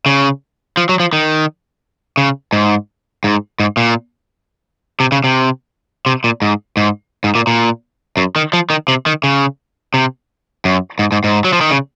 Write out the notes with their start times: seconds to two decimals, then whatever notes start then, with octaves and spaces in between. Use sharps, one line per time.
0.06 C#3
0.77 F3
0.89 F#3
1.00 F3
1.13 D#3
2.17 C#3
2.53 G#2
3.24 G#2
3.60 G#2
3.77 A#2
5.00 C3
5.12 C#3
5.24 C3
6.06 C3
6.24 A#2
6.42 G#2
6.77 G#2
7.24 G#2
7.35 A#2
7.47 A#2
8.17 F#2
8.36 D#3
8.53 F3
8.70 D#3
8.88 C3
9.06 D#3
9.24 C#3
9.94 C3
10.65 F#2
10.99 G#2
11.12 G#2
11.24 G#2
11.44 F#3
11.53 F3
11.61 D#3
11.71 C#3